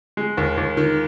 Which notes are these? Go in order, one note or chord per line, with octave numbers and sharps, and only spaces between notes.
G#3
D#2
D#2
D#3